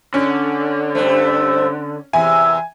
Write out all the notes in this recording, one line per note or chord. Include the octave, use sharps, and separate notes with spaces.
D3 C#4
G2 A3 C5
E2 C3 E5 G#5